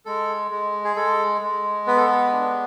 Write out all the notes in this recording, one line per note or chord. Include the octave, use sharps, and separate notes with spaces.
G#3 A4
G#3
G#4
G#3 A4
G#3
B3 B4
A4
B4
D4